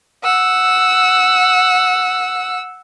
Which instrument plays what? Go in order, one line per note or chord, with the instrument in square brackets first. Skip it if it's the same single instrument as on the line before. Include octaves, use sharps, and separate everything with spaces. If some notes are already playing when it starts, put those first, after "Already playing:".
[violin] F#5 E6